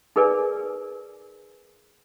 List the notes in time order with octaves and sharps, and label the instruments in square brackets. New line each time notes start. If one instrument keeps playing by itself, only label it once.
[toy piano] D#4 G#4 A#4 B4 D5 G#5